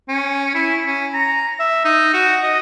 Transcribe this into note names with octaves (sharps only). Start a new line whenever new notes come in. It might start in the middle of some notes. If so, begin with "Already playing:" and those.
C#4
E4
C#4
A#5
E5
D#4
F#4
D#5